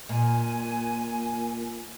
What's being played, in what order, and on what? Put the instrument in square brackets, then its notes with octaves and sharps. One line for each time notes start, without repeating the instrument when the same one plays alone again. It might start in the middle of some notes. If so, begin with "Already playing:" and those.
[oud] A#2 [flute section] G#5